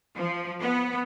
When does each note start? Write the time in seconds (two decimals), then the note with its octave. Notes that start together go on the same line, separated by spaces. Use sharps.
0.17 F3
0.60 B3